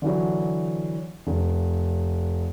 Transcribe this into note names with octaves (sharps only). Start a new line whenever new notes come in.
D3 E3 F#3
F1